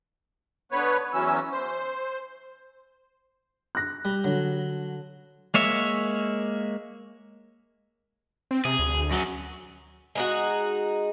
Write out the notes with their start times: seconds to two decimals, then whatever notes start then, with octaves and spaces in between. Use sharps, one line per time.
0.72 D3 B3 B4 C#5
1.13 E2 E3 F#3 C#4 E6
1.52 C5
3.75 F#6 A#6
4.05 G3
4.24 D3 F#3
5.54 G#3 A#3 C#5 E5
8.51 C4
8.65 C3 G#4
8.79 D2
9.11 F#2 F#3
10.15 G#3 D#4 F#4